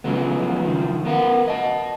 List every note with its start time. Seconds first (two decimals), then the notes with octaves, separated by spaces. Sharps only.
0.04 C#3 F3 F#3 G#3 B3
0.62 D#3 F3
1.05 B3 A#4 F5 F#5
1.48 D#5 A5